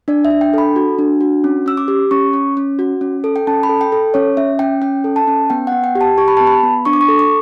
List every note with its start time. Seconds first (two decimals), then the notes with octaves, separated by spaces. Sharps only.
0.08 D4 D5
0.25 E5
0.31 D4
0.41 G5
0.53 A4 B5
0.76 F#4
0.98 D4
1.21 F#4
1.44 C#4
1.66 C#4 E6
1.77 D6
1.88 G4
2.11 C#4 C#6
2.33 C#4
2.57 C#4
2.79 F#4
3.01 C#4
3.24 A4
3.36 G5
3.47 C#4 A5
3.63 B5
3.69 A4
3.81 G5
3.92 A4
4.14 C#4 C#5
4.37 C#4 E5
4.59 C#4 G5
4.82 C#4 G5
5.04 A4
5.16 A5
5.28 C#4
5.50 B3 G5
5.67 F#5
5.72 B3
5.84 G5
5.96 G4
6.01 A5
6.18 G4 C#6
6.28 B5
6.37 B3 A5
6.47 B5
6.63 B3
6.85 D4 C#6
6.93 D6
7.01 C#6
7.09 A4
7.19 D6